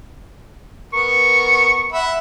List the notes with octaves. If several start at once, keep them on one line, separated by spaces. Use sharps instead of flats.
B3 A#4 C#6
E5 F#5 B5